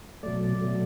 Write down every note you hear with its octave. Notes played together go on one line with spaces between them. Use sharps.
B2 F#3 A3 D5
B2 F#3 A3